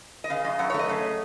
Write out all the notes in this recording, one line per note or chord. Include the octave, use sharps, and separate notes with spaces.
D#5
C#3 F5
F#2 D#5
F#2 F#5
C#5
A3
D#5
C#3